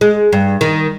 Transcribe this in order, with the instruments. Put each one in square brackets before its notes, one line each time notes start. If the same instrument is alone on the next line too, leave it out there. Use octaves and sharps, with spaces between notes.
[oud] G#3
G2
D#3